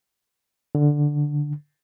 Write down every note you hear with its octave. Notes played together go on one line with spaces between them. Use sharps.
D3